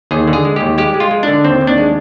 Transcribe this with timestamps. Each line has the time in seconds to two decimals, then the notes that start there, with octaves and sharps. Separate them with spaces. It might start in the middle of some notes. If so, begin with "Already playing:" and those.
0.11 D#2 G#4
0.28 D3
0.33 G#4
0.45 G#3
0.56 D#2 G4
0.78 G#3 G4
0.94 G#3
1.00 F4
1.11 G#3
1.23 D3 D4
1.44 D#2 C4
1.61 D#2
1.67 D4
1.78 G#3